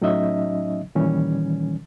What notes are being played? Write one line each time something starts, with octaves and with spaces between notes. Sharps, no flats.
A2 F#3 C#4 D#4 D#5 E5
A#2 D#3 E3 G3 C#4